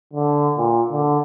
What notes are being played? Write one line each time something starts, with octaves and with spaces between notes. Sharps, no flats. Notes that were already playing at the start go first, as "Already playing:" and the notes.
D3
A#2
D3